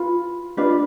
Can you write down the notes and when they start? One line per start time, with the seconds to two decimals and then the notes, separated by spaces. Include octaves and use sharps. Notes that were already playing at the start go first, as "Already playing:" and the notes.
Already playing: F4 B4 F5 B5
0.57 D4 F4 B4 D#5